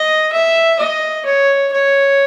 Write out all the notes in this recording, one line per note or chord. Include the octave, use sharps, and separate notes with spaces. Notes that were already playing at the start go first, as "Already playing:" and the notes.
Already playing: D#5
E5
D#5
C#5
C#5